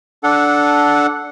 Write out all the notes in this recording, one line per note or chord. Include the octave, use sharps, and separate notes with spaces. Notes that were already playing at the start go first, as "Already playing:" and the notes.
D4 A4 F#5